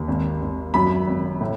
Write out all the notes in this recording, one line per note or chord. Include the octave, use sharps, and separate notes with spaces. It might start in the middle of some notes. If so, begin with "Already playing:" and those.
Already playing: D#2
G#1
G#1
F#2 B5
G#1
A2